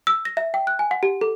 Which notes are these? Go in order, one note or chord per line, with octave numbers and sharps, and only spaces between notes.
E6
A#6
E5
G5
F#6
G#5
F#5
G4
A4